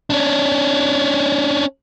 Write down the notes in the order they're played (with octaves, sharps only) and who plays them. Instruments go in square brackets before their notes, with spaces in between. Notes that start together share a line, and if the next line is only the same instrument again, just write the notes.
[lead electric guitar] C#4 D4